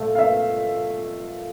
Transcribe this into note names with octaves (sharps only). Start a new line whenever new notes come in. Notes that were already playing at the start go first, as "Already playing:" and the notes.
Already playing: A#2 A3
F5
E5